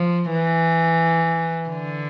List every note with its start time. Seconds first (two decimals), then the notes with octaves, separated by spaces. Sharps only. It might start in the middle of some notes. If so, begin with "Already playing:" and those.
Already playing: F3
0.32 E3
1.69 D3